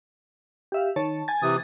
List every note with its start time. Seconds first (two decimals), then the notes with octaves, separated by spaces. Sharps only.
0.72 G4 E5 F5
0.96 D#3 C#5 A5
1.28 G#5 G#6 A6
1.42 C3 E3 D#6